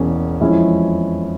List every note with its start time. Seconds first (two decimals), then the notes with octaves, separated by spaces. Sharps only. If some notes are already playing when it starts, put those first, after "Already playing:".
Already playing: E1 E2 A#3 C#4
0.41 F2 E3 G#3 C#4 E4